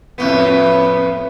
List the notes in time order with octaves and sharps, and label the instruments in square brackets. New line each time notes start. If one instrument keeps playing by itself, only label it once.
[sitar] F2 A2 B3